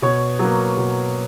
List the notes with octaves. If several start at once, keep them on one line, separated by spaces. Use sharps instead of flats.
B2 C#5
F#3 A#3
B2